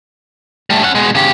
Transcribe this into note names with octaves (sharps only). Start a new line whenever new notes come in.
G3 A3
C#4 F#5
B2 G#3
C#3 G4